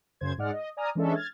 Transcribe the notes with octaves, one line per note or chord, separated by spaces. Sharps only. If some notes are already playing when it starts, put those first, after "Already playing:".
F#2 C#3 C5 G#6
G#2 G#3 D5 F#5 F6
D#5
D5 G#5 A#5 D#6 F6
E3 G#3 C#4 D4 A4 E5
F6 G#6 A6